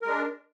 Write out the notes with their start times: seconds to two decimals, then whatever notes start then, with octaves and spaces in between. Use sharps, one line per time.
0.02 A#4
0.05 G#3
0.09 D4